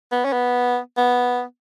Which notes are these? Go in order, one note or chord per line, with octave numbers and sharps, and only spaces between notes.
B3
C#4
B3
B3